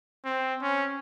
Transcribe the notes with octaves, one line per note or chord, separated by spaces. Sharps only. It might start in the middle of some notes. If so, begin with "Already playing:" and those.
C4
C#4